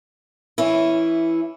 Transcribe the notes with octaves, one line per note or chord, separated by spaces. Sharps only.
E3 C#4 E4